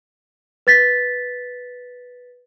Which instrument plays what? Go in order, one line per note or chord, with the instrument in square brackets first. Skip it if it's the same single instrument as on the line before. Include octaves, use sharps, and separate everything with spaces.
[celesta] B4 A6 B6